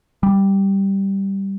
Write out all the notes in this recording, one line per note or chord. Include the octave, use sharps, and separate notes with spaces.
G3